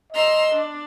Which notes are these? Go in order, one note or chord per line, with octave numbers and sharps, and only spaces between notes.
D#5 A#5 C6 E6
D4